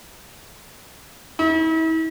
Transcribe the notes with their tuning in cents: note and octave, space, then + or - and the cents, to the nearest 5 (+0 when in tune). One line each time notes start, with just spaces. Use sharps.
E4 -40